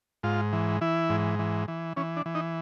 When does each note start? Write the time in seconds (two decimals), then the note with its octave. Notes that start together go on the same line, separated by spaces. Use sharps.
0.23 G#2 F4
0.53 E3
0.81 E3 E4
1.10 G#2
1.39 E3
1.68 E3
1.97 E3 C#4
2.17 D4
2.26 E3
2.35 D#4